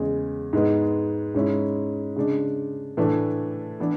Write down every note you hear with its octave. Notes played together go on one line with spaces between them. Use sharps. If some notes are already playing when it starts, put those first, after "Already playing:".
Already playing: E2 C#3 G#3
G#2 G#3 B3
G#2 G#3 C#4 E4
C#3 G#3 D4
A2 E3 A3 D4
E3 B3 D4